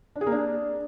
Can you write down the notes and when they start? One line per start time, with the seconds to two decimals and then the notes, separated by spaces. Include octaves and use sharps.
0.16 D4
0.21 G#4
0.26 A#3
0.32 D4